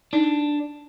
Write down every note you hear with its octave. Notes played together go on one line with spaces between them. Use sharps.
D4 D#4